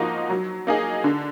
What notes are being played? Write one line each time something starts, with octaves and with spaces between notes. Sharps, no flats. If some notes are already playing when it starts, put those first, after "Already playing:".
Already playing: G#2 F3 A#3 D#4 F#4
F#3
A#3 D#4 G#4
D3